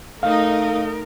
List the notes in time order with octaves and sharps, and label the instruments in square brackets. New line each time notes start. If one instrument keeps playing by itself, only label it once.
[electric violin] A3 [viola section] D#4 D#5 [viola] A#4 [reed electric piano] F5